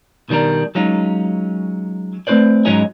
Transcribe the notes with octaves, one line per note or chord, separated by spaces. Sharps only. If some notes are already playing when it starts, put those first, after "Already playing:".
B2 D#3 G3 D4 A#4
F#3 G#3 C#4 D#4 F4
A3 C4 F#4 B4 C5 D5
G#2 F#3 G#3 C#4 D#4 G#4